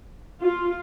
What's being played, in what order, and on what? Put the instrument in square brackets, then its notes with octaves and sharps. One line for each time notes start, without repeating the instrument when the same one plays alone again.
[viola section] F4